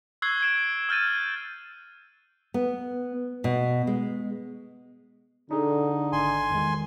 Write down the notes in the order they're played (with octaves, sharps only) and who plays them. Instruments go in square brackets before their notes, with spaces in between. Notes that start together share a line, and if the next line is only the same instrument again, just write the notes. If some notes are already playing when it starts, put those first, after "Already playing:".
[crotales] C#6 E6 F#6 G#6 C7 G7
G#6 D7 E7
E6 F6 G6 A6 D#7
[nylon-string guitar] B3
B2
G#3
[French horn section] D3 [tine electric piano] D4 G#4 A4 [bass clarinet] D#4
[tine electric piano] G#1 [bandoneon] G#5 C6
[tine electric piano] E2 D#3 G#3